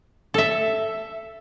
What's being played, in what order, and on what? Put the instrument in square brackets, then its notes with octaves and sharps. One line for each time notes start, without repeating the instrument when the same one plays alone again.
[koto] A4 E5